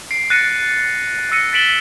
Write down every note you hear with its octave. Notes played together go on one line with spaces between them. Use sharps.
C7 D7
F#6 A6 A#6 C7 C#7 D#7
E6 A#6 C#7 D#7
A6 B6 D7 E7 F#7 G7